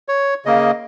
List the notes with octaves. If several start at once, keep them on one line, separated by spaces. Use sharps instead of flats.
C#5
C#3 A#3 D#5